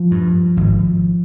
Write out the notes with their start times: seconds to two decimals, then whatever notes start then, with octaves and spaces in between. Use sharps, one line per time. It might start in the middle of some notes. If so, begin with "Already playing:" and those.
Already playing: F3
0.11 G2
0.57 G#1